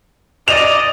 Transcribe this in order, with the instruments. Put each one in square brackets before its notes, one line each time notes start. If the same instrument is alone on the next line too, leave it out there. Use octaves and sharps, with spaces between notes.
[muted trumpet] D5 [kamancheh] D#5 [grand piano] F7